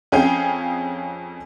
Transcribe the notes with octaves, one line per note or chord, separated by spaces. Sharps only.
F2 C#4 G#4 F5 G5